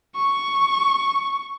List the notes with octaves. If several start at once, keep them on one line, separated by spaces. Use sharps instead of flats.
C#6